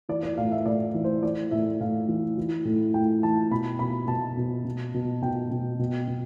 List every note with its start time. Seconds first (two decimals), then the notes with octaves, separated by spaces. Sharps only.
0.09 E3 D5
0.23 D5
0.37 A2 F5
0.52 E5
0.66 A2 D5
0.94 E3
1.04 C5
1.23 E3 D5
1.51 A2 E5
1.80 A2 F5
2.08 E3
2.38 E3
2.65 A2
2.94 A2 G5
3.23 E3 A5
3.51 B2 B5
3.79 B2 B5
4.08 B2 A5
4.37 B2
4.65 B2
4.94 B2
5.22 B2 G5
5.51 B2
5.79 B2
6.08 B2